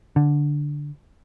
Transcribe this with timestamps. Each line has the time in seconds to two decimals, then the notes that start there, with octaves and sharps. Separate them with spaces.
0.16 D3